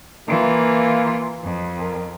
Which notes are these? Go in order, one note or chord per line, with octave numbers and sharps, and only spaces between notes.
E3 A#3 F4
F2
A#4